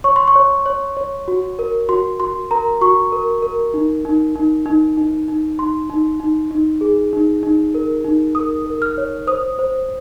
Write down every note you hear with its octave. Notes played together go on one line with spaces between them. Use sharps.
C#5 C#6
C6
C#6
C#5
C#5
C#5
F#4
A#4
F#4 C6
F#4 C6
A#4 A#5
F#4 C#6
A#4
A#4
D#4
D#4
D#4
D#4
D#4
D#4
D#4 C6
D#4
D#4
D#4
G#4
D#4
D#4
A#4
D#4
A#4 D#6
A#4
F6
C#5
C5 D#6
C5